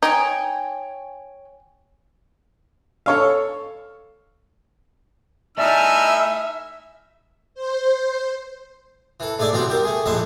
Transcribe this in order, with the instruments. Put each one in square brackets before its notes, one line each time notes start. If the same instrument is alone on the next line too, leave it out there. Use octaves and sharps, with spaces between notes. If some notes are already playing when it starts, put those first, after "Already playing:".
[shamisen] D#4 [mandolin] C#5 G5 G#5
[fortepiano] A4 C#5 F5
[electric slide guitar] A3 D5 G#5 [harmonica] D#4 E4 F6 [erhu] E5
[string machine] C5
[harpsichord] E3 A4
G#2 A3 G#4 D5 E5 D6
B2 E3 C4 F#4 G4
C2 G4 A#4
A3 G#4
A#1 F2 A2 G#3 E5 A5